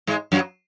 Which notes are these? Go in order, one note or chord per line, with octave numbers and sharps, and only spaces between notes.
G#2 G#3
F#2 F#3